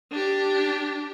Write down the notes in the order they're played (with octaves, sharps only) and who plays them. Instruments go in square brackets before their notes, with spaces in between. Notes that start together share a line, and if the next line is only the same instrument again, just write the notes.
[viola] D4 G4